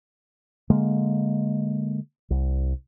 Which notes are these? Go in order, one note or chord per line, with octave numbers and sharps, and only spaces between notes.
D3 G#3 A#3
C2